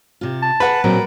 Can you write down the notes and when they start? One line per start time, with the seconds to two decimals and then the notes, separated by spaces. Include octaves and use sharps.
0.21 C3 F4
0.42 A5
0.60 G#4 B4 F#5
0.84 A#2 F#3 C4 A#4